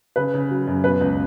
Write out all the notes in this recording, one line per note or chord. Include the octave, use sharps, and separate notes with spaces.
C#3 B4
C#3
F#3
F#2
B2 B4
C#2